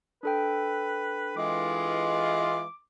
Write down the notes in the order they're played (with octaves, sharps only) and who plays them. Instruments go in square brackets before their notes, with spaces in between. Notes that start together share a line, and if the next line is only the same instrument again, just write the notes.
[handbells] D4 A4 G5 [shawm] B4
[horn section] E3 G#3 F4 [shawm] D6